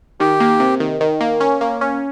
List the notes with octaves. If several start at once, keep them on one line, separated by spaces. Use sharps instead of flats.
D#3 G4
A#3
C3
D#3
D#3
A#3
C#4
A#3
C#4